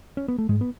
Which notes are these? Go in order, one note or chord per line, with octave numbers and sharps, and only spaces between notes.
C#4
B3
A3
G#2 G#3
B3